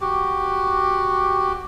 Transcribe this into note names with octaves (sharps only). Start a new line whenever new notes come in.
F#4 G4